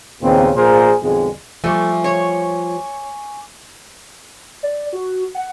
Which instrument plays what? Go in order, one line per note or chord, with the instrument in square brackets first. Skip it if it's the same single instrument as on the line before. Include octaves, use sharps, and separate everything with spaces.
[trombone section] D#2 A#2 C#3 B3 C4
A#1 A#2 G#4 A#4 C5
B1 F2 D3 G#3
[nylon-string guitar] F3 G3 [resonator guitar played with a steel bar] A3 [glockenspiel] G#5 C#6 D6
[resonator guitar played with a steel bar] C#5
[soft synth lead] D5
F#4
F#5